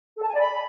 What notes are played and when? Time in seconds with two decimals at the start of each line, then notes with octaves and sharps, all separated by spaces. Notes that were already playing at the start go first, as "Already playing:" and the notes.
0.16 A4
0.22 A5
0.28 G#5
0.34 D5
0.39 B5